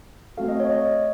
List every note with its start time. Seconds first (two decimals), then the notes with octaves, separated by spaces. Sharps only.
0.37 A3 C4 F#4 A4 F5
0.48 D#5
0.60 C#5
0.71 D#5